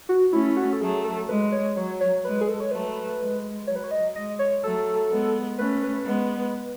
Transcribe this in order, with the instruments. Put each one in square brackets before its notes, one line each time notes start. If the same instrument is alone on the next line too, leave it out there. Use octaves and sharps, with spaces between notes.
[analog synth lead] F#4
[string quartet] A3 C#4 [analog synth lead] E4
[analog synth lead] F#4
A4
[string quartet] F#3 A3 [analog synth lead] G#4
[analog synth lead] A4
[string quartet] G#3 [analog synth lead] B4
[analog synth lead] C#5
[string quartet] F#3 [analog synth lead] C#5
[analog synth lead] C#5
[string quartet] G#3 [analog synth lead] B4
[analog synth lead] G#4
A4
C#5
[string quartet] F#3 A3 [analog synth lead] B4
[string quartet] G#3
[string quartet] F#3 [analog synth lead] C#5
[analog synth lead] B4
C#5
D#5
[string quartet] G#3 [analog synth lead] D#5
[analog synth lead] C#5
[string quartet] F#3 A3 [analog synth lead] A4
[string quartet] G#3 B3
[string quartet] A3 C#4 [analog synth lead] B4
[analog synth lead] B4
[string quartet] G#3 B3